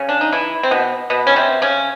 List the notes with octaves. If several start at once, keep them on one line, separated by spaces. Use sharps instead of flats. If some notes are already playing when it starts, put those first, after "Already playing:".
Already playing: C#3 C#4
D4
D#4
E3 E4
C4
B2 B3
B2 B3
C#4
C3 C4
C#3 C#4